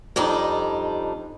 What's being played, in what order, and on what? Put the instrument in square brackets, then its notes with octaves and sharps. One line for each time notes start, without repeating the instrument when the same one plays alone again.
[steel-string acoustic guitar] F2 G3 D4 D#4